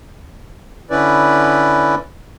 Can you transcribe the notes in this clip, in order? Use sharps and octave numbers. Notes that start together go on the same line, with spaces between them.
D3 C#4 E4 B4 D5